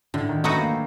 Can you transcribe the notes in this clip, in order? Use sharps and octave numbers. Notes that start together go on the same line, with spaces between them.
A2 D3
D#3
F#3 A3 B3 D#4 F#4
A#3